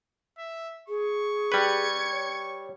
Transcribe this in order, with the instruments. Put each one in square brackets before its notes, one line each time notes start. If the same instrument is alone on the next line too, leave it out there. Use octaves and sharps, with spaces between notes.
[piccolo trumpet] E5
[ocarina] G#4 [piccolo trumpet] C#6
[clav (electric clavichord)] G3 B4 [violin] G#6 C#7
[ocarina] C#5